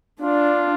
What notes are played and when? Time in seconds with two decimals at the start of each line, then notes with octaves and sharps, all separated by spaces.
0.21 D4 F4